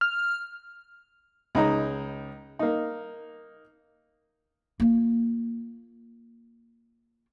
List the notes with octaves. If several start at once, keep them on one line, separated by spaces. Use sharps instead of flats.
F6
C#2 D#4 A#5
A#3 D#4
A#3 F4